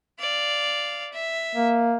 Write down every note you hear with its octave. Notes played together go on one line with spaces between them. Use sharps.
D5 F5
E5
A#3